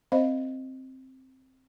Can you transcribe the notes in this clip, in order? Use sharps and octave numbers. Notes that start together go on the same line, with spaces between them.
C4 C5 D#5 F5